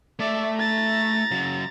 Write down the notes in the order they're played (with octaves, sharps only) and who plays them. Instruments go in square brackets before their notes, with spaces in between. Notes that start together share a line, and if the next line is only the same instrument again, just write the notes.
[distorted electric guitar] A3 E5 [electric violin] D5
[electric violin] A#5 A6
[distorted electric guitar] C#3 F#3